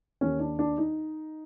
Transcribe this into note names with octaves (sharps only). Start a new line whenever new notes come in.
D#2 D#3 C#4
D4
D4
D#4